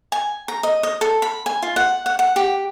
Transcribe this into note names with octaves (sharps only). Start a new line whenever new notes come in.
G#5
A#5
D#5
D#5
A4
B5
G#5
F4
F#5
F#5
F#5
G4